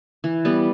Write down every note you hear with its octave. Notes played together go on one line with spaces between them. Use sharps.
E3
G3 B3